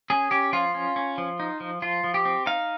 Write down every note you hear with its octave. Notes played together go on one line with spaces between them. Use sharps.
C#4 G#4
C#4 G4
F3 F4
C#4
C#4
F3
D#4
F3
F3 F4
F3
G4
C4
D#4 F5